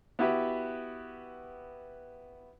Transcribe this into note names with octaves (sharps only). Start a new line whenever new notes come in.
B3 E4 F#4 G4 B4